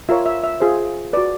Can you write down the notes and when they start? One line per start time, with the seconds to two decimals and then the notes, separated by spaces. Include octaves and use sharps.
0.09 F4 A#4 C#5 E5
0.26 E5
0.44 E5
0.60 F4 G#4 C5
1.13 F#4 B4 D5